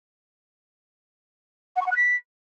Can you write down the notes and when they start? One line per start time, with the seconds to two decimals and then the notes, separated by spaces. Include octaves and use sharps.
1.76 F#5
1.81 C#6
1.86 F#5
1.91 F#6
1.96 B6